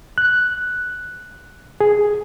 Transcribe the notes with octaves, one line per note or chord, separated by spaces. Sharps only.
F#6
G#4